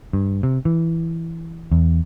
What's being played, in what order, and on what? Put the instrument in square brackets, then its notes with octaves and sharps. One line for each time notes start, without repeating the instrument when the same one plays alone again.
[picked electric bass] G2
C3
E3
E2